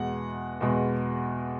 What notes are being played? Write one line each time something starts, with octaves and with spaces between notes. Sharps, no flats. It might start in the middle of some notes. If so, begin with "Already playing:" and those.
Already playing: E2 B2 G#3 F#5
E2 B2 G#3